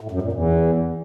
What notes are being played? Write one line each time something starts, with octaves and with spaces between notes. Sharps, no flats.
A2
F#2
A#2
E2